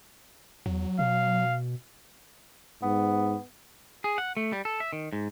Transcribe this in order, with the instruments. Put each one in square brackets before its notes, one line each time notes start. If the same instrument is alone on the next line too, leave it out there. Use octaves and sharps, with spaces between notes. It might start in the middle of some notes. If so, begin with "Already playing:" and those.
[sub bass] E2 [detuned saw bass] F#3
[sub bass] B2 [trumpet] F5
[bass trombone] G#2 [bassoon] B3
[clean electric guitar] G#4
F#5
A3
G3
A4
E5
D#3
G#2